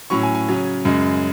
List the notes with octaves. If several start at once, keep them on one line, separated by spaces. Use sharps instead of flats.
A2 F#3 C#4 C#6
G#5
G#5
C#3 F#3 C#4
F#2 C#3 G#3